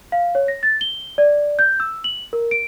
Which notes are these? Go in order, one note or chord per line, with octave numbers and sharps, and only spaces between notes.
F5
C#5
A#6
A6
G7
D5
G6
E6
F#7
A#4
D7